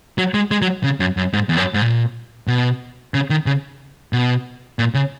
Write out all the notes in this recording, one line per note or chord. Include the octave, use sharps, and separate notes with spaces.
F#3
G#3
G#3
F#3
C#3
F#2
F#2
G#2
E2
F#2
G#2
A#2
B2
C#3
D#3
C#3
B2
A#2
C#3